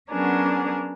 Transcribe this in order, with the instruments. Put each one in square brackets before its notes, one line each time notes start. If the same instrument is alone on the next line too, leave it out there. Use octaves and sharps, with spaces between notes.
[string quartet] F#3 B3 C#4 D4 G#4 A#4